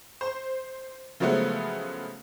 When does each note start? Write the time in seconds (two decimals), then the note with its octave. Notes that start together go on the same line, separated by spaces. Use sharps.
0.21 C5
1.20 C#3 F3 F#3 G#3 A3 B3